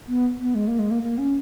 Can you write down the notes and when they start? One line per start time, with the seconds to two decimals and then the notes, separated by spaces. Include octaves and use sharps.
0.08 B3
0.39 B3
0.55 G#3
0.67 A#3
0.79 G#3
0.91 A#3
1.03 A#3
1.18 C#4